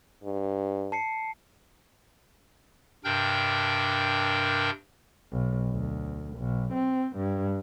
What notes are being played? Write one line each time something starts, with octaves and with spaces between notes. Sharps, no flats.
G2
A5 C7 C#7
G2 C3 D4 A#4 G5 G6
B1
D2
B1
C4
G2